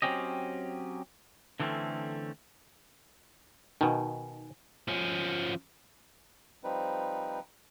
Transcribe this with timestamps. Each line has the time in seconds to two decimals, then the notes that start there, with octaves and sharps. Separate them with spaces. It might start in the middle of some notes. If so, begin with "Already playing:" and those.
0.02 F#3 G3 C4 C#4 G4 D#5
1.60 D3 E3 G3 A3 C4 C#4
3.81 B2 D#3 D#4 G#5
4.88 F3 C#4
6.64 F3 G3 C4 D#4 B4